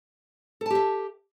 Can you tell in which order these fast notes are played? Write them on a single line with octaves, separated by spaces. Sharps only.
A4 A5 G4 E5